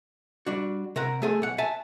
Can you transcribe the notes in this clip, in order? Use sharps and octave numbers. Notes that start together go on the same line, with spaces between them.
G3 D4 F#4
C3 A#4 F#5
A3 G#4 A4
B1 F#5
E5 G#5 A5